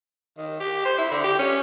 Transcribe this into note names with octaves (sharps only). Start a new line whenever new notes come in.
D#3
G4
C5
E4
D3
G4
C#4